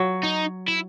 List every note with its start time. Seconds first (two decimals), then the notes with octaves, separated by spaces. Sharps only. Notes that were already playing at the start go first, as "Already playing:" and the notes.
Already playing: F#3
0.23 D#4
0.68 E4